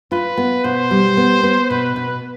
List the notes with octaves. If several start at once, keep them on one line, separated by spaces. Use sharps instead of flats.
F4 B4
B3
B2 C5
G3
B3
B3
B2 B4
B2